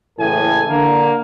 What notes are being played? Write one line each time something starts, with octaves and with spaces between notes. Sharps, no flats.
F#1 A2 E3 G#4 A4 G#5
D3 A#3